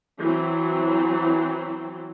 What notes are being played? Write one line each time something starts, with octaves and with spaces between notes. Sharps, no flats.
E3 F#3 C4